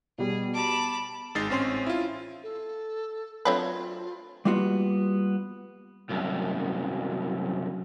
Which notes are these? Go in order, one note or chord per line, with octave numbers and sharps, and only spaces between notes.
B2 G3 G#4
A5 B5 D6
G#1 G#3 D#4 A6 C7
A1 C4 C#4 C6 C7
E4 F4
A4
F#3 A3 C4 D4 F4 B4 C#5
G3 A#3 B3 F4 F#4
C2 F#2